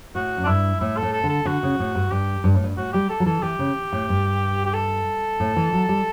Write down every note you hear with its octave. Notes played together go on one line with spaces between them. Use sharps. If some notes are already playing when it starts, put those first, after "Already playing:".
A2 F#4
F#2
D4
G2 E4
A2 E4
A4
A2
A4
D3
A4
D3 F#4
C#3
A2
G2
G2 G4
G2
A2
G2
A2 F#4
G3 G4
A4
F#3
E3 A4
E3 G4
C#3
A2
G2
G4
A4
A2
E3
F#3
G3